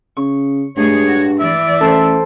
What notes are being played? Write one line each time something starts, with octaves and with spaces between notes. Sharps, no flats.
C#3 C#6
G2 G#3 A3 G#4 C#5
F#4
E3 D5 E5
A1 A4 C5